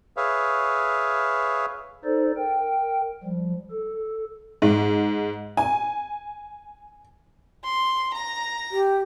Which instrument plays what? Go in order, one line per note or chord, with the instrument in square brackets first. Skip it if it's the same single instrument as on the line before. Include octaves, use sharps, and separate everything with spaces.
[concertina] G#4 B4 C#5 E5 F5
[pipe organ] D#4 A4 C5 D5
A#4 G5
F3 G3
A4
[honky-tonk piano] G#2
G#5
[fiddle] C6
A#5
[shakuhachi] G4